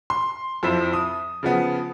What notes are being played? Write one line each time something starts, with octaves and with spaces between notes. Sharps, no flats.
C6
F2 F3 E4 C5 E5
D#6
C#3 F3 B3